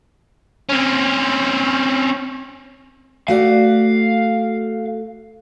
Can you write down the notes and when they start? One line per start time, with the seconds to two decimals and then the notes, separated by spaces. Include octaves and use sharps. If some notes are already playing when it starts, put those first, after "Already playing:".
0.69 C4 C#4
3.28 A3 F#4 D5 F5